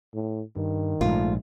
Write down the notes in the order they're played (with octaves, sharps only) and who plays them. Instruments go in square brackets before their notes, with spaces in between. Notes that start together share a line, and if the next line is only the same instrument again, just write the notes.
[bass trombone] A2
[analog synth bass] G2 [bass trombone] D#3
[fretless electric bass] A#1 G#2 [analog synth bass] A3 [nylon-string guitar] F4